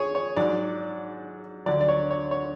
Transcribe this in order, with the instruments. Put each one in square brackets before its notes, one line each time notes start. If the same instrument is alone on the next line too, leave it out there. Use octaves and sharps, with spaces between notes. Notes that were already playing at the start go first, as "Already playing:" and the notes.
Already playing: [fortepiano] G#4 C#5
C#5
G#2 F#3 D5
D2 D3 F#3 D5
D5
C#5
C#5
C#5